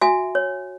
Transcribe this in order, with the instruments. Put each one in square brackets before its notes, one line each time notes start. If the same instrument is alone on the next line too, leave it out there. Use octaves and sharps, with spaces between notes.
[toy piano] F#4 E5 G#5
C#5